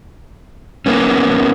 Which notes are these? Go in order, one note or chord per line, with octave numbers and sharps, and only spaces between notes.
A#3 B3 C#4